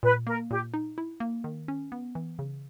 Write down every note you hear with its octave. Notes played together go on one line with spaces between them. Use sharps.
A#2 B4
A#3 A#4
A#2 G4
D#4
E4
A#3
D#3
C#4
B3
E3
C#3